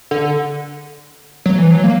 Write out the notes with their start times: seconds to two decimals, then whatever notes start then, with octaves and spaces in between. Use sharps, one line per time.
0.11 D3
1.46 F#3
1.58 E3
1.71 F#3
1.84 A#3